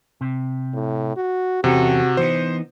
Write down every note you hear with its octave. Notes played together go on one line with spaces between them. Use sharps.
C3
A2
F#4
E2 C3 C#4 F#4 A4
E3 B3 D#4 C5